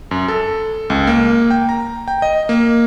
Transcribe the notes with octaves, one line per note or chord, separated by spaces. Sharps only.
F#2
A4
C#2
A#3
G5
A#5
G5
D#5
A#3